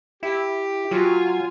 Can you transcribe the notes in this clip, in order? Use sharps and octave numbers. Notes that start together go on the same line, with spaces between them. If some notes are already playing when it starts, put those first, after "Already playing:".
E4 G4
F#3 F4 G#5